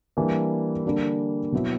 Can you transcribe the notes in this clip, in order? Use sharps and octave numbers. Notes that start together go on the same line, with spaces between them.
E3 G3 A#3 D4
D3 G3 A#3 D4
B2 F#3 B3 E4